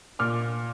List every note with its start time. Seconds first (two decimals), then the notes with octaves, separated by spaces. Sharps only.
0.19 A#2 D6 F6